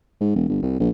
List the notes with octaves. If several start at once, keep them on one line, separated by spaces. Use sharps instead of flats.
G#2
E1
G1
C2
A#1